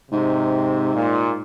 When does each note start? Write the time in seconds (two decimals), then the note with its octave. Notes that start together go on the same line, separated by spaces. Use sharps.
0.11 G#2 C3
0.95 A#2